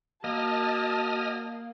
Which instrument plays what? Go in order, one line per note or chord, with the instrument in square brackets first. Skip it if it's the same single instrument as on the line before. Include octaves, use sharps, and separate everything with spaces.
[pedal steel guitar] A#3 [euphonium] F#4 [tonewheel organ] D#5 D#6 F6 [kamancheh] A5